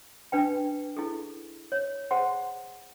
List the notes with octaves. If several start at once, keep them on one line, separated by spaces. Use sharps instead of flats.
D4 B4 G5
E4 G#4 A4
C#5
G#4 C5 F#5 C6